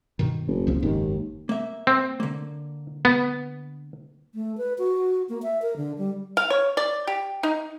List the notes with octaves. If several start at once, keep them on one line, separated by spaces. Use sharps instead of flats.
G2 B2 D#3
F#1
C#2 F3 C4
F#1 D#2 G#2 D#3
A#3 E5
C4
D3 A#3
B3
A3
B4
F#4
A#3
E5
A#4
D3
G3
F5
C#5
D5
G4
D#4